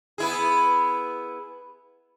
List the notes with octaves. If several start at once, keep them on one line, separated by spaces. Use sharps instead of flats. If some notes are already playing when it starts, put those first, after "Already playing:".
B3 E4 G#4